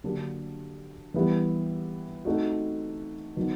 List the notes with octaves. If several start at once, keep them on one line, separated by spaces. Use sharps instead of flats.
D3 F#3 A#3 D4 G4
E3 G3 B3 E4 G4
A3 C4 D#4 F#4
D#3 F#3 B3